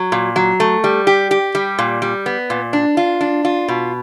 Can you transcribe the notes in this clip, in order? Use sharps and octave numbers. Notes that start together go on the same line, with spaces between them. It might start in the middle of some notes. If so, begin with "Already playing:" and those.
Already playing: F#3
A#2
F#3
A3
G3
G4
G4
G3
A#2
G3
B3
A#2
D4
F4
D4
F4
B2